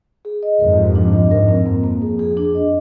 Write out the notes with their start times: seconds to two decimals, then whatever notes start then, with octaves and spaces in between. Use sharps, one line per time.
0.25 G#4
0.43 D#5
0.60 F2 G#2 A#4
0.78 G4
0.95 D4
1.13 D#5
1.30 F2 G#2 A#4
1.48 C4
1.66 F2 A#3
1.84 A#3
2.02 G#4
2.19 G#4
2.37 D4
2.55 D#5